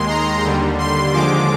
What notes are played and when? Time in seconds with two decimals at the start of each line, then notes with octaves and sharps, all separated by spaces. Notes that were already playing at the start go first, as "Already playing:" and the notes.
Already playing: D#2 D#3 G#3 C6
0.08 A#5
0.43 D#2 D3 G3
0.78 C6
1.13 D#2 D3 F3 G#3 D6